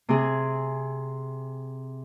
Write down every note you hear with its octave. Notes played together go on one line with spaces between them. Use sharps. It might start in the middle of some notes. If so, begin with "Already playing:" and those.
C3 C4 G#4